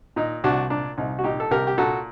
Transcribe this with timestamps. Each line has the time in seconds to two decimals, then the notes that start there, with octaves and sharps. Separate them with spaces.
0.16 A#2 D#4
0.44 C2 D4 F#4
0.70 A#2 D4
0.97 C2 D#4
1.19 F#4
1.24 A#2 D#4 G4
1.40 A4
1.51 C2 G4 A#4
1.67 G4
1.78 A#2 F#4 A4